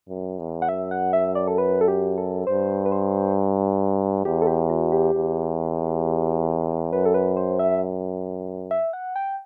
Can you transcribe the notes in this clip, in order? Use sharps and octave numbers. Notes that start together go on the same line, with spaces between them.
F#2
E2
F#5
F#2 E5
F#5
E5
D5
A4
B4
A4
G4
A4
G2 C5
B4
C5
E2 G4
A4
G4
F#4
G4
E2
F#2 B4
A4
B4
C5
E5
E5
F#5
G5